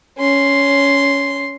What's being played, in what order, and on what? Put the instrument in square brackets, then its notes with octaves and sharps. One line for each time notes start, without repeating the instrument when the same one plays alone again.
[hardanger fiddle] C#4 C6